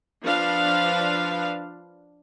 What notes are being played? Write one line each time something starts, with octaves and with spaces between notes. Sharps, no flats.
F3 D4 B4 F5